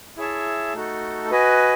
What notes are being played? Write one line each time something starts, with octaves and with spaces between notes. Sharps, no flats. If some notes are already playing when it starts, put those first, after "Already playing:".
E4 G#4 C#5 E5 A5
A3 D#4 F#4 A4
F#4 B4 D#5 G#5